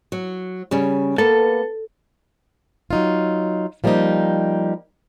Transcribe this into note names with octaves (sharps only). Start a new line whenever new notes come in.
F#3
C#3 G3 C#4
A#3 B3 A4
F#3 D#4 F4
F3 G3 A#3 B3 D#4 G4